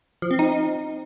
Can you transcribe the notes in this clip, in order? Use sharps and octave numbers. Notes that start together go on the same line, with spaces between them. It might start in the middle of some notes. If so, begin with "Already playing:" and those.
F3
C4
D#4